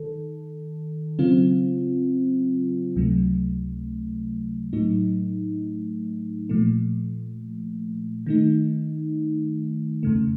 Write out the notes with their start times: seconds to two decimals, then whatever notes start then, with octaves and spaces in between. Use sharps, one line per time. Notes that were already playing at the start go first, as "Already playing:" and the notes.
Already playing: D#3 A4
1.19 C#3 F#3 C4 F4
2.96 C#2 C3 F#3 A3
4.73 A2 F#3 A3 D#4
6.49 A#2 F3 A3
8.26 D#3 A3 D#4
10.03 F2 C#3 A3